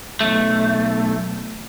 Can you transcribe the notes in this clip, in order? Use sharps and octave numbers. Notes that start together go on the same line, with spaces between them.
B1 A3